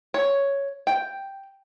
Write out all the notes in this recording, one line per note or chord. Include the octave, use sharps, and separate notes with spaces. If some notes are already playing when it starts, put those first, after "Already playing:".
C#5
G5